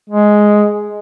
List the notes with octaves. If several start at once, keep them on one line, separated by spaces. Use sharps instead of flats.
G#3